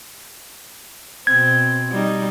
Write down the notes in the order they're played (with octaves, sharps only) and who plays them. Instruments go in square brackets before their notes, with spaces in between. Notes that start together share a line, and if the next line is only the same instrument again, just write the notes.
[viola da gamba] B2 C4 [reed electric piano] G#6
[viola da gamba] G3 D#4